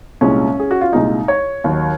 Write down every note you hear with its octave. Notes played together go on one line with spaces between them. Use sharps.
C2 A#2 G#3 C#4
G#4
F#4
F4
C2 A#2 G#3 D#4
C#5
D#2 D#3 F#3